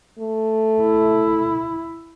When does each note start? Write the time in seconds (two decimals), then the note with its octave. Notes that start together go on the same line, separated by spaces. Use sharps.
0.19 A3
0.82 E4